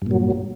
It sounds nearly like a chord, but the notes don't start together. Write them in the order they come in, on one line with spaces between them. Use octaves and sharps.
G2 A#2 F#3